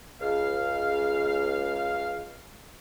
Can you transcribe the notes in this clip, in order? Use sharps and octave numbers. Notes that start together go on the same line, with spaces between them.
C#2 F5